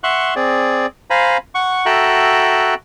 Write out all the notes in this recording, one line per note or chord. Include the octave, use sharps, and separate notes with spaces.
E5 F#5 C6 C#6 F#6
C4 G#4 D5
C5 F5 G#5 A#5 B5
F#5 C#6
F#4 A4 E5 G5 A#5 F#6